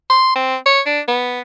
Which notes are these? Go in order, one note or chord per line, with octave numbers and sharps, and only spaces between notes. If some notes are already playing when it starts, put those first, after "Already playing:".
C6
C4
C#5
D4
B3